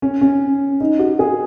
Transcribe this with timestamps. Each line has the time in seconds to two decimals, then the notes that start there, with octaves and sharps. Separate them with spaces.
0.02 C#4
0.21 C#4
0.80 D#4
0.99 F#4
1.19 G#4